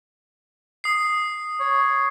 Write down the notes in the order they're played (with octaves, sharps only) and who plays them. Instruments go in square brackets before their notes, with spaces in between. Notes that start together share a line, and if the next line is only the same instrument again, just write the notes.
[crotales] D#6 C7
[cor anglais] C#5